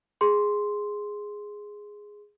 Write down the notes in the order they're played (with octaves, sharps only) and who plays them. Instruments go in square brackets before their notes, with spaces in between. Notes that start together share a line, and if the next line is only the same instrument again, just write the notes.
[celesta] G#4 C6